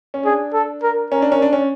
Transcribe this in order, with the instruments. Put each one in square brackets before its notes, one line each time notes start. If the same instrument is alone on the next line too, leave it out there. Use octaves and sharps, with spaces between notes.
[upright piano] C#4
[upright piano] D4 [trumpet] G#4
[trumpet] A4
A#4
[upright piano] C#4 [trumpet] A#4
[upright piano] D4
C#4
D4
C#4